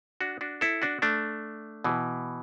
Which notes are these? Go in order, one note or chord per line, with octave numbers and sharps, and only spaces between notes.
D4 F#4
D4 F#4
E4 A4
D4 F#4
A3 D4
B2 E3